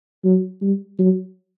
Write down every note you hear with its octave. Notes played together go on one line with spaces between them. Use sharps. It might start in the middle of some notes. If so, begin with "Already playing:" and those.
F#3
G3
F#3